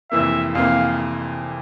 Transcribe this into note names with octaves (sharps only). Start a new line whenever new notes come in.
F1 F2 E3 A#3 E5
F1 F2 E3 A#3 F5